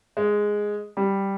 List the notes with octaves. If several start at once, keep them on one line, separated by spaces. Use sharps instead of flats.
G#3
G3